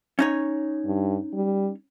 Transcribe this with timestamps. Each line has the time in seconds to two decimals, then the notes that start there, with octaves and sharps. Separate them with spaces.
0.19 C#4 D#4 C#5
0.85 G2
1.33 G3